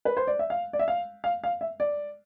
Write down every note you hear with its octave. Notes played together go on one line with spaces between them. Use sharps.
B4
C5
D5
E5
F5
D5
E5
F5
F5
F5
E5
D5